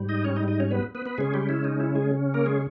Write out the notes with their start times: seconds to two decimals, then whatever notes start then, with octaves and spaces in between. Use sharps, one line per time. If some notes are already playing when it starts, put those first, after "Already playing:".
Already playing: G#2 G3
0.09 D#4 D#5
0.24 C#4 C#5
0.36 D#4 D#5
0.48 D#4 D#5
0.60 C#4 C#5
0.71 B3 B4
0.95 B3 B4
1.06 B3 B4
1.18 C#3 G#3 C#4 G#4
1.34 G3 G4
1.49 E4
1.64 D#4
1.80 E4
1.95 G#3 G#4
2.34 A#3 A#4
2.46 G#3 G#4